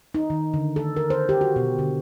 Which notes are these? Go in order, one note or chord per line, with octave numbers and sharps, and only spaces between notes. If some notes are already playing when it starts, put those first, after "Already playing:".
D#4
D#3
D3
A4
A#4
C5
G4
F#4
B2
D3